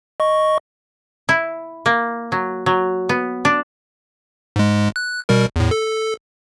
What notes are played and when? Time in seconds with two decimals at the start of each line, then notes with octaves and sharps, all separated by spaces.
0.20 D#5 C#6
1.29 E4
1.86 A#3
2.32 F#3
2.66 F#3
3.09 B3
3.45 D4
4.56 G#2 G#3
4.96 F#6
5.29 B2 G3 A#4
5.56 E2 A2
5.71 A4